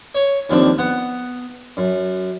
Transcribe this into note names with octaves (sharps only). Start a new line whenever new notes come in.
C#5
D#2 F3 C4 D4
B3 F#5
F#2